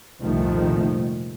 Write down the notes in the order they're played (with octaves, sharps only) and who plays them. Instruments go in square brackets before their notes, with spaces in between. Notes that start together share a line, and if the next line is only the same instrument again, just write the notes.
[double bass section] C2 F2 A#2 D#3 F3 A3